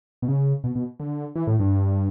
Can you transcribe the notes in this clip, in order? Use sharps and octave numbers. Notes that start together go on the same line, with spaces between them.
B2
C#3
B2
B2
D3
E3
A2
G2